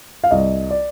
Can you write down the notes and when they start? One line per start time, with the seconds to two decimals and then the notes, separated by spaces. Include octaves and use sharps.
0.24 F5
0.31 C2 D#5
0.71 D5